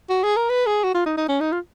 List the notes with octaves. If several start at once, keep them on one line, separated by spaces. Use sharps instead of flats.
F#4
G#4
A#4
B4
G#4
F#4
F4
D#4
D#4
C#4
D#4
F4